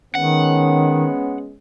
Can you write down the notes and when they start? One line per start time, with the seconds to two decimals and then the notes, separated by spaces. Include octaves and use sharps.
0.15 D#3 G#3 B3 C#4 F#5